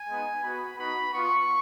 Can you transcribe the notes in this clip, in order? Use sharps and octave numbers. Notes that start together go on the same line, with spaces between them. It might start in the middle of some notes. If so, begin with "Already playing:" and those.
Already playing: G#5
G#3 B3 D#4
B3 F#4 B5
B3 D#4 F#4 B5
B3 F4 C#6